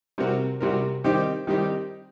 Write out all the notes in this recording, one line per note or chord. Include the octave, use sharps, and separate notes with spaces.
C3 G3 C4 F#4 A#4
C3 G3 C4 F#4 A#4
D#3 G3 C4 D#4 G4
D#3 G3 C4 D#4 G4